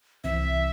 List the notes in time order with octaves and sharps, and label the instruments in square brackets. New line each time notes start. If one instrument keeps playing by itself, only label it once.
[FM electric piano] C2 C3 E3 C4 [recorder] E5